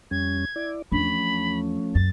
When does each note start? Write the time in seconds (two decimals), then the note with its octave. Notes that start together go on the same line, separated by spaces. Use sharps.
0.11 F2 G3 C#4 G#6
0.56 E4 D5
0.92 E2 F3 A3 C#4 D4 B5
1.95 F#2 A6